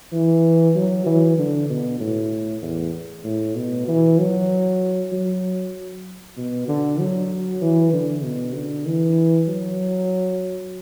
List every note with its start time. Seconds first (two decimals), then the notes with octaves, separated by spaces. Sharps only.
0.13 E3
0.76 F#3
1.06 E3
1.38 D3
1.70 B2
2.00 A2
2.62 E2
3.24 A2
3.55 B2
3.88 E3
4.19 F#3
5.12 F#3
6.37 B2
6.68 D3
6.99 F#3
7.62 E3
7.93 D3
8.24 B2
8.55 D3
8.86 E3
9.48 F#3